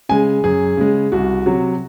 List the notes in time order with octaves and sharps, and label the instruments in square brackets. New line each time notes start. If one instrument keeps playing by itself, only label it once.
[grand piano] C#3 G#3 G#5
F#2 G#4
C#3 G#3
C2 F#4
C3 F#3